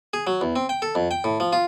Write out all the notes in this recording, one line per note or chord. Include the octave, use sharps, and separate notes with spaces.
G#4
F#3
E2
C4
G5
A4
F2
G5
A2
F3
F4